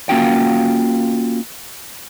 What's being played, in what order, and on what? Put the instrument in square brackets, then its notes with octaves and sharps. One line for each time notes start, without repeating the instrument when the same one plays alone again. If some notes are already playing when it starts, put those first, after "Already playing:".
[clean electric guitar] A#3 C#4 F4 F#4 G5